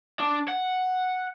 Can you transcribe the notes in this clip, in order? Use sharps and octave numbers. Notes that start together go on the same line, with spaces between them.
D4
F#5